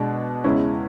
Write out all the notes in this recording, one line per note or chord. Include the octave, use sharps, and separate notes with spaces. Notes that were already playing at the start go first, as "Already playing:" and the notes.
Already playing: B2 G#3 D4
E2 C#3 G#3 C#4 E4